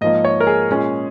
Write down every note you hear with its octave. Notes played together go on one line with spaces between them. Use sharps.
G#2 F3 A#3 D#5
C#5
A#4
G#4
A#2 G#3 C#4